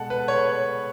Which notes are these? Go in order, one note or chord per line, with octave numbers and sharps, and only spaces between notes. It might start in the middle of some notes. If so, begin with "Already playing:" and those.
Already playing: B2 G#3 A4 F#5
B4
C#5